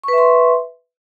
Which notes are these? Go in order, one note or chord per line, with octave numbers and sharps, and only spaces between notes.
B4 E5 C6 C#6